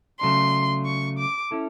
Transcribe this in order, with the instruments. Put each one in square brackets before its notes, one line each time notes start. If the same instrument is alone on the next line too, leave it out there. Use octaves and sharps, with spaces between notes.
[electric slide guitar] C#3 F#3 A3 D4 [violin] C6
[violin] C#6
D6
[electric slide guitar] C#4 E4 A4